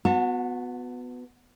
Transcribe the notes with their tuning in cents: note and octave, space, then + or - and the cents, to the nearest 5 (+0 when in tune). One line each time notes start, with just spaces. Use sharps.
B3 +15 F#4 -25 A5 +35